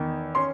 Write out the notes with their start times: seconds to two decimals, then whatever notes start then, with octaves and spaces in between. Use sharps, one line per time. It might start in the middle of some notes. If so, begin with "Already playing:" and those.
Already playing: E2 D#3
0.35 C#4 C6